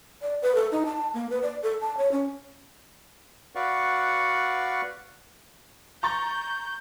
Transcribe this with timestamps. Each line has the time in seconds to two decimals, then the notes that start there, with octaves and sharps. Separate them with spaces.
0.22 D5
0.42 B4
0.55 A4
0.72 D#4
0.86 A5
1.14 A#3
1.30 B4
1.42 D5
1.63 A4
1.81 A5
1.97 C#5
2.12 C#4
3.55 F#4 B4 D5 F5 F#5 C#6
6.03 A#5 C#6 G6 A6